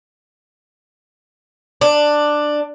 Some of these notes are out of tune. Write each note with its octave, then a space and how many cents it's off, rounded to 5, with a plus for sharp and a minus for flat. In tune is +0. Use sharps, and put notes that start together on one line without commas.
D4 +10